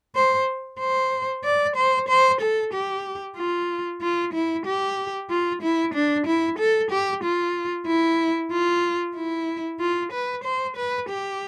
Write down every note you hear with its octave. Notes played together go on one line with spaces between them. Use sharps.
C5
C5
D5
C5
C5
A4
G4
F4
F4
E4
G4
F4
E4
D4
E4
A4
G4
F4
E4
F4
E4
F4
B4
C5
B4
G4